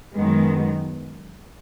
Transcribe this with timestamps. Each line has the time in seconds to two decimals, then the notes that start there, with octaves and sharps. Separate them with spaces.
0.14 F#2 D#3 G#3 B3